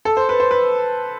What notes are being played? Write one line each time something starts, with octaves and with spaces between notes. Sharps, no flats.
A4
C5
B4
C5
B4